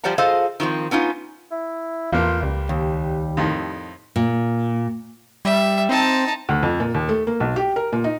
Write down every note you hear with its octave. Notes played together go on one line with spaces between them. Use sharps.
F3 G3 C5 D5 F#5 A#5
F4 G#4 A4 C5 D#5 F5
D#3 F3 A#3 C4
B3 C#4 D#4 F4
E4
A1 E2 A#3 F4
C#2 G3
D#2
F2 A2 D#3
A#2
G3 E5
C4 D#4 A5
D2
F2
A#2
D#2
A3
A#3
B1
G4
A#4
A#2
D#4